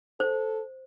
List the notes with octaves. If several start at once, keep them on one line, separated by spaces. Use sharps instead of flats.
A4 C5